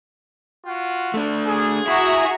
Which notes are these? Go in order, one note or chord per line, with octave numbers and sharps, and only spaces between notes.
F4 F#4 F#5
A3 D4
G#4
E4 F#4 E5 A#5